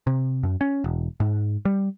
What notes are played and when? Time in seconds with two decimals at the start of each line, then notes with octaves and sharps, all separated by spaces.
0.07 C3
0.43 F#2
0.61 C#4
0.84 E1
1.20 G#2
1.65 G3